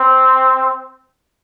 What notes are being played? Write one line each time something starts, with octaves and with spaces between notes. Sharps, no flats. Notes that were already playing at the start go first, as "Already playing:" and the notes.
Already playing: C4